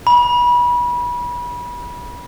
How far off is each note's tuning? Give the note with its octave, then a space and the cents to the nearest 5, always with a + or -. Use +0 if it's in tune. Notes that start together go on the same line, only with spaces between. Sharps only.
B5 -30